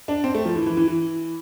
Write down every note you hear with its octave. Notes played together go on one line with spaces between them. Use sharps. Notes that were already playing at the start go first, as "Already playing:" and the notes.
D4
C4
A3
F3
E3
E3
E3
E3